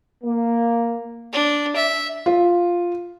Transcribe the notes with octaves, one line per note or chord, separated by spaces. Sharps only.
A#3
D4
E5
F4